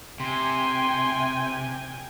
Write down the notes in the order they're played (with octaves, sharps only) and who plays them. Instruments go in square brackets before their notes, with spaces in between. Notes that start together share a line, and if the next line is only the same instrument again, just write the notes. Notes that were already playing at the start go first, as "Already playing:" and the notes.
[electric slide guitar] C3 [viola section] G5 G#5 [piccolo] C6